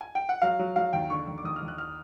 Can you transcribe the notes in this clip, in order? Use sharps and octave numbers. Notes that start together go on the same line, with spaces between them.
G#5
G5
F#5
F#3 F5
F#3
F#3 F5
D#2 G5
D3 C#6
D#2
D6
D#2 D#6
F6
D#2
F#6
F6